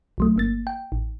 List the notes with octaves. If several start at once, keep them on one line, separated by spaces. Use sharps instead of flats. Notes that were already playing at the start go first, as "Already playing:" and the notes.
B1 F#3 A3
G1 A#3 A6
G5
A1